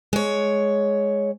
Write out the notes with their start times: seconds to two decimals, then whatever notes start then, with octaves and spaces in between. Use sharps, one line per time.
0.13 G#3 C#5